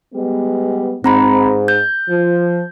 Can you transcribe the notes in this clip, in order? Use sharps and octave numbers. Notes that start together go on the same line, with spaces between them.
G3 G#3 B3
G#2 C4 A#5 B5
G6
F3